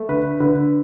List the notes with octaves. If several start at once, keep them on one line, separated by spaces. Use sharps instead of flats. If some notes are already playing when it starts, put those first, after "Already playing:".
Already playing: A3
D3 B4
D3 B4